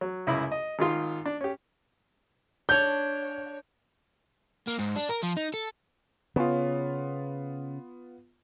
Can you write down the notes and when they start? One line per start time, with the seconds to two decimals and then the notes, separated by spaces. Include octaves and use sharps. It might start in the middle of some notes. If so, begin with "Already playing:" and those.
0.01 F#3
0.27 C#2 F#2 E4 B5
0.52 D#5
0.79 G#1 D#3 F4 C6
1.26 D4
1.41 C#4 G4
2.69 D4 C#5 G6
4.67 A#3
4.79 G#2
4.96 D4
5.09 A#4
5.23 F3
5.37 D#4
5.54 A4
6.36 C#3 B3 F4